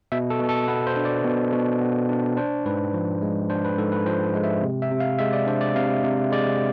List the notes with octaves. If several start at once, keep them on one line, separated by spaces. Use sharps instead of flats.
B2 E5
A4
B2
A4
B3 B4
C5
D4
D5
B2
B2
B3
D4
D4 C5
G#2 B4
F3
G#3
D4 C5
B4
G#2 A4
B4
F3 C5
G#3
E5
C3
E5
C3
F5
G#3 E5
D5
D4 C5
D5
C3 F5
C3
G#3 D5